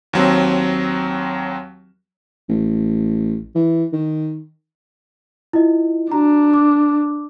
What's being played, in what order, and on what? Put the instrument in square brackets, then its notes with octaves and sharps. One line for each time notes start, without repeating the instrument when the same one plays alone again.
[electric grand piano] D#2 F#3 C4
[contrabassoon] A1
E3
D#3
[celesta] E4 F4 D#5
[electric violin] D4 [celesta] F#4 A#5
[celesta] D6